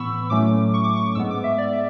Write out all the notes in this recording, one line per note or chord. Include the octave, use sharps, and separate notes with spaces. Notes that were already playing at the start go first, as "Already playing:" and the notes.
Already playing: A2 E3 B3 B5 C#6 E6
A2 F#3 A3 C#4 D6
C#6
D6
C#6
G#2 G#3 B3 E6
D6
E5
D5
E5